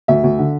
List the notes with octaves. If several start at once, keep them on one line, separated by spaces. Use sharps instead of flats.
D2 E5
D2
D3